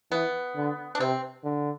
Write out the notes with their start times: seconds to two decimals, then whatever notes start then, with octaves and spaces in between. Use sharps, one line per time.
0.11 E3 B3
0.56 D3
0.95 D4
1.00 C3 C4
1.44 D3